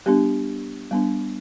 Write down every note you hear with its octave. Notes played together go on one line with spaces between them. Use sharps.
G3 B3 D4 G4
G3 B3 D4